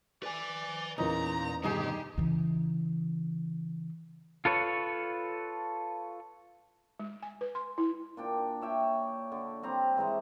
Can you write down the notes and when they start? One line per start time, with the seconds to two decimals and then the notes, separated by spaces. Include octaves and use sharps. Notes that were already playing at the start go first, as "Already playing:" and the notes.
0.23 B4 D5 G#5
0.98 E2 A#2 C#4 D#4 A#4 A#5
1.64 G2 B2 D3 D#3 D#4 G4 G#4
2.18 C#3 E3
4.45 F4 A4 B4 C#5
6.99 G#3
7.23 G#5
7.41 B4
7.55 C6
7.78 E4
8.17 A#2 D4 G5
8.62 C#5 E5 G5
9.32 D3
9.63 G3 C4 A#5
9.97 G#2 E3 G#3 A#5